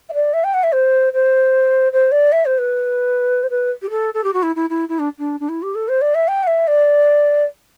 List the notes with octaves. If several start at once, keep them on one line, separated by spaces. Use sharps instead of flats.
E5
D5
E5
G5
F#5
E5
C5
C5
C5
D5
E5
C5
B4
C5
B4
G4
A4
A4
G4
F#4
E4
E4
E4
E4
D4
D4
D4
E4
G4
A4
C5
D5
E5
G5
F#5
E5
D5